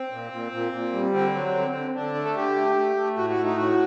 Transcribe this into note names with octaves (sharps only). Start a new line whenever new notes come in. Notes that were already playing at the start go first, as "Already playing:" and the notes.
Already playing: C4
A#2
A#2
A#2
A#2
G3
D3 C4
F#3
D3
D3
D3 D4
A3
A4
D3 G4
A3
A3
A3
A2 F#4
F#4
A3
D#4
A2 F#4